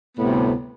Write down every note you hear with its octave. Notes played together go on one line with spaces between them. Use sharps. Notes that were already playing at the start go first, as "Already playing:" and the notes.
D2 A2 C3 G3 B3